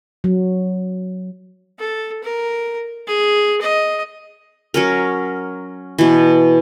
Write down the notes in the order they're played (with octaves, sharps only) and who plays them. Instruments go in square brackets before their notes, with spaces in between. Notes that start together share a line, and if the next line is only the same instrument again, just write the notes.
[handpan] F#3
[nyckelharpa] A4
A#4
G#4
D#5
[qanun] F#3 C#4 A#4
B2 E3